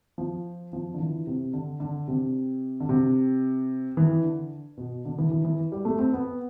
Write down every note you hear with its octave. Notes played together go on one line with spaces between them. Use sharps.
F3
F3
D3
E3
C3
D3
D3
C3
D3
C3
E3
D3
B2
D3
E3
E3
E3
G3
A3
C4
B3